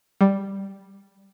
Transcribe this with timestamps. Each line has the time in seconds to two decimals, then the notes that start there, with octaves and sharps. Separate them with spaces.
0.21 G3